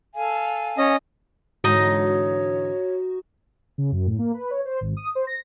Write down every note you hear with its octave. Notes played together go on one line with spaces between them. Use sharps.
A4 F5 G#5
C#4 D#5
G#2 D3 E3 D#4 F#4 C#5 D#5
C#3
F#2
A2
A#3
B4
C#5
C5
G#1
D#6
C5
A#6